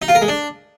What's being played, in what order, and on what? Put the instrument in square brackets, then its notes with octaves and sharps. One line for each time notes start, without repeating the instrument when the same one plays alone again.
[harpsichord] D#4
F4
A#4
G#3
D4